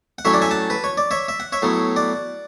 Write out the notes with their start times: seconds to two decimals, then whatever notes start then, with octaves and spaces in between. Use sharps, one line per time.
0.18 F#5
0.25 A2 F#3 C#4 C#5 E5
0.33 D5 F#5
0.42 E5 G#5
0.51 F#5 A5
0.70 B4
0.84 C#5
0.98 D5
1.11 C#5 E5
1.28 E5
1.40 F#5
1.52 C#5 E5
1.62 A2 F#3 B3
1.96 D5 F#5